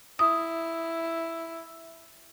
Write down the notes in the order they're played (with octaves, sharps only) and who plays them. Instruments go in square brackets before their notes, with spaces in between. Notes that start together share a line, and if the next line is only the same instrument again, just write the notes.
[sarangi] E4 [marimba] D#6